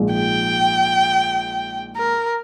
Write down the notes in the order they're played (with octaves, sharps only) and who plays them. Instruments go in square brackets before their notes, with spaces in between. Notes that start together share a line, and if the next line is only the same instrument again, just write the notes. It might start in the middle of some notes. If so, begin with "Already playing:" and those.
Already playing: [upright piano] A#1 G#2 F3 G#3
[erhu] G5
A#4